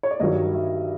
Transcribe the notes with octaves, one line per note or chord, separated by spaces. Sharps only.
C#5
D5
G2 D#3 F#3 D#5
E5